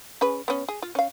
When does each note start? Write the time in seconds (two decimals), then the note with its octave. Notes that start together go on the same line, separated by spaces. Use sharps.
0.21 C#4 G#4 B4
0.48 B3 C#4
0.69 G#4
0.82 F4
0.95 C#4 F5